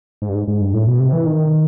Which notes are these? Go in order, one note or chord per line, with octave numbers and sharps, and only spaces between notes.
G#2
G2
G#2
G#2
G2
A2
B2
C3
E3
D#3